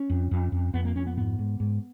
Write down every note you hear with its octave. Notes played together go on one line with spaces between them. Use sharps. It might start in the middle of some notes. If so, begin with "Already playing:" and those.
Already playing: C#4
F2
F2
F2
F2 B3
A#3
F2 C#4
B3
G#2 B3
G#2
G#2